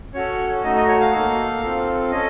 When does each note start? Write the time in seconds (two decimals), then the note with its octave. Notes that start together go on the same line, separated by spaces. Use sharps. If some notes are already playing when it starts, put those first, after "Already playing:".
0.14 C#4 F#4 A4 C#5
0.63 A3 D#4 F#4 D#5
0.75 D#5
0.88 C#5
1.00 F5
1.13 A#3 D#4 A4
1.62 C4 F4 A4
2.11 C#4 A4 D#5